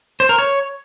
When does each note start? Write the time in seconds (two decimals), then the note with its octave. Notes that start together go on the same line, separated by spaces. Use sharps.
0.20 C5
0.29 A#4
0.39 C#5